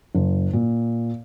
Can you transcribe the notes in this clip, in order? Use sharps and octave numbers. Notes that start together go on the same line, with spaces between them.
F#1
A#2